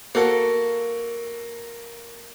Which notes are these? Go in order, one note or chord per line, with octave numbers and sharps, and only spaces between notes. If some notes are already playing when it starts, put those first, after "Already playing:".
A#3 F#4 A4